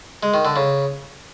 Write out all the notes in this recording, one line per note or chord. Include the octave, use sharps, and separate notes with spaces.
G#3
D#3
D3
C#3